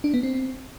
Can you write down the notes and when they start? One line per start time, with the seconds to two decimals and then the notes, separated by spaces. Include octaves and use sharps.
0.04 D4
0.14 B3
0.23 C4